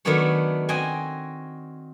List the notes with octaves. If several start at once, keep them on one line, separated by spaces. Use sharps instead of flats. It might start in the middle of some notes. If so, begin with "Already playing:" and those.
D#3 F#3 A3 B3 D4 C#5
C4 F#4 D#5 G5 G#5